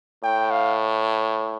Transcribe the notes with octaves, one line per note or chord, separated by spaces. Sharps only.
A2 G5
F5